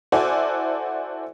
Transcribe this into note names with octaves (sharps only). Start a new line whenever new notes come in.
E4 F#4 A4 C5 D5 G#5